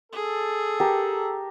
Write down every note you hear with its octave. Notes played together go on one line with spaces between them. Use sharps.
G#4 A4
G4 A#4 A5